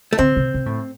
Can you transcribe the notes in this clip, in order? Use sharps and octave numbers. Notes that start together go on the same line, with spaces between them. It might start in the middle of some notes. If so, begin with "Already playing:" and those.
A3
D3 C4
C3
C3
A2